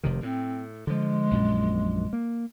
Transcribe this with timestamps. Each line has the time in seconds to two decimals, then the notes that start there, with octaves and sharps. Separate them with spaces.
0.03 F1 C3 D#3
0.23 A2 C4
0.87 D3 F3 G#3
1.31 A#1 F#2 A#2
2.13 A#3